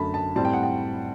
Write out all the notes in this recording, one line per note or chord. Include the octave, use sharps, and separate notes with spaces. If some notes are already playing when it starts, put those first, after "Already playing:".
Already playing: F#2 D3 A3 A5 B5
A5
A2 G3 C4 A5
G5
F#5
G5